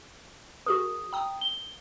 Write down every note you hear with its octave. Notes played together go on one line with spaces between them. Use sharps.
F#4 G#4 A#4 D#6
G5 A#5 D#6
G7